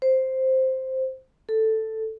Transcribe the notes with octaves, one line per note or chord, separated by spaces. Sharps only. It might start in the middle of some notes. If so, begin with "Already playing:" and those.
C5
A4